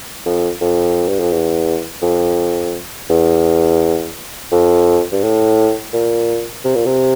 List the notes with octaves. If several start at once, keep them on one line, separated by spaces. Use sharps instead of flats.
F2
F2
G2
F2
E2
F2
E2
F2
G2
A2
A#2
C3
A#2
C3